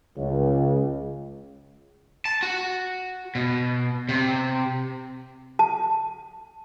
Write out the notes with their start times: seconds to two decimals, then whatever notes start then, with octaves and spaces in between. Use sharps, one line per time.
0.17 C#2
2.25 A5
2.43 F#4
3.35 B2
4.09 C3
5.59 A5